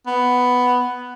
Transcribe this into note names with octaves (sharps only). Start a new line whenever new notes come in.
B3